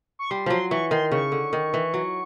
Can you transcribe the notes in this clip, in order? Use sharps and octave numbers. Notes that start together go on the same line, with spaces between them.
C#6
G3 C6
F3 F#3 C6
E3 C#6
D#3 C6
C#3 C#6
D3
D#3
E3
F#3